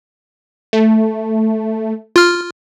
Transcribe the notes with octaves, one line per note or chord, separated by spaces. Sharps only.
A3
F4 F6